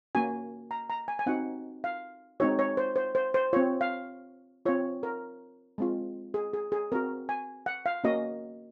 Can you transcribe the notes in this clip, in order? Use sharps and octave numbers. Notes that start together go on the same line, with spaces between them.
A#3 C#4 F#4 G#5
A#5
A#5
G#5
G#5
C4 D#4 F#4 F#5
F5
G#3 C4 D#4 F#4 C#5
C#5
C5
C5
C5
C5
C4 F4 C#5
F5
C4 F4 C#5
A#4
G#3 C4 F4
G#4
G#4
G#4
C4 F#4 A#4
G#5
F#5
F5
A#3 C#4 F#4 D#5